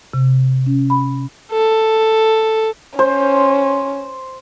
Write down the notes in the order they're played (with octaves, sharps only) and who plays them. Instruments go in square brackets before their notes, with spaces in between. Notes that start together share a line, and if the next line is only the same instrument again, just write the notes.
[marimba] C3
C#4
B5
[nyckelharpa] A4
[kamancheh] C#4 [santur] C5